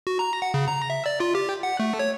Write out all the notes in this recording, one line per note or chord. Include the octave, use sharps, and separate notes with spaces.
F#4
A#5
F#5
C#3
A#5
E5
D5
F4
G4
F#5
A3
C#5